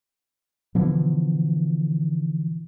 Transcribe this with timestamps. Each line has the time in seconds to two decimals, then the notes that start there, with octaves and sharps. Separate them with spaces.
0.75 B2 D3 E3 F3